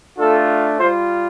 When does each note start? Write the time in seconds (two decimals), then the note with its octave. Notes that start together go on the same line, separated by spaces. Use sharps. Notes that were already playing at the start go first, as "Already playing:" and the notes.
0.19 A3 D4 F4 A4
0.79 G3 F4 C5